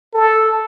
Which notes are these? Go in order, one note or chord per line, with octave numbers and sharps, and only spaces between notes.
A4